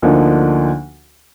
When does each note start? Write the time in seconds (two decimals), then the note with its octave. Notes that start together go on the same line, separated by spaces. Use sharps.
0.02 D2 D3 F3 A#3 D#4